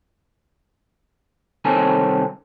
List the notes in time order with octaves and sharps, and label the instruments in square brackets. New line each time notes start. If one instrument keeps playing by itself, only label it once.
[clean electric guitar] C2 D#3 C4 C#4 A4 G#5